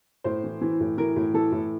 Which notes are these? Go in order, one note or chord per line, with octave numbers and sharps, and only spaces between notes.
A2 C5
E3
E3
A2
E3 A#4
A2
E3 A4
A2